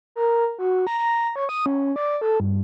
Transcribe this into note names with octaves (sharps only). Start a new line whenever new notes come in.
A#4
F#4
A#5
A#5
C#5
D#6
C#4
D5
A4
G2